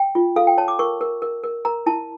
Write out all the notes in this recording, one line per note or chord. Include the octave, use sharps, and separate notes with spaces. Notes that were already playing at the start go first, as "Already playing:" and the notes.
Already playing: G5
F4
A4 F5
G5
C#5 A5
D6
A#4 C#6
A#4
A#4
A#4
A#4 A#5
E4 A5